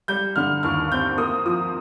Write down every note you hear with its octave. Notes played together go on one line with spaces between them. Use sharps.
G3 G6
D3 F6
D#2 F6
C4 G6
A#3 D#6
F3 D#6